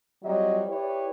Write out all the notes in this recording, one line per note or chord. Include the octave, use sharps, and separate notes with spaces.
F#3 G3 C4 F4 D#5
E4 G4 B4 C#5 D5